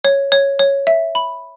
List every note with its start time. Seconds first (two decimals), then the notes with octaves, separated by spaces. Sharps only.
0.05 C#5
0.32 C#5
0.59 C#5
0.87 E5
1.15 B5